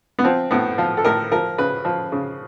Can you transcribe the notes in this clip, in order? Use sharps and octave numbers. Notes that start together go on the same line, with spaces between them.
B3
F3 C4
A2 B3
F3 F4
A4
A2 A#4
F3 A#4
C#3 B4
F3
C#3